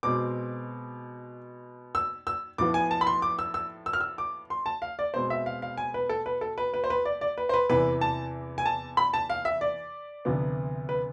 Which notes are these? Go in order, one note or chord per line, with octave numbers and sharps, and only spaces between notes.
B2 G#3 C4 D6
E6
E6
A2 F3 B3 D6
G#5
A5
B5
C6
D6
E6
E6
E6
F6
E6
D6
C6
A5
F5
D5
B2 G#3 C4 C5
E5
F5
F5
G#5
B4
A4
B4
A4
B4
B4
C5
B4
D5
D5
B4
C5
B4
E2 C3 E3 B4
A5
G#5
A5
B5
A5
F5
E5
D5
D2 C3 F3 B3
B4